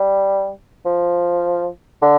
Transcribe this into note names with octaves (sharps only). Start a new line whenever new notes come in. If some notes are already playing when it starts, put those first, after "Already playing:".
Already playing: G3
F3
D3